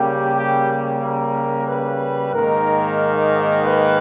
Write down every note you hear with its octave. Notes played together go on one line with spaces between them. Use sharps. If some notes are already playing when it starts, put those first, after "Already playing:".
Already playing: C#3 G3 A#3 G4
G4
A#4
B4
G#2 D#3 A#3 A#4
B4